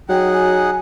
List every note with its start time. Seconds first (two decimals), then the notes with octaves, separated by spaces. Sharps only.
0.09 F#3 D#4 G#4 F#5 G5
0.32 G#5